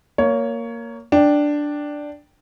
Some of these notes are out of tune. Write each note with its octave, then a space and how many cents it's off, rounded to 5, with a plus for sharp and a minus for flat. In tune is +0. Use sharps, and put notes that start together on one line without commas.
A#3 -5 C#5 +15
D4 +0 G5 +0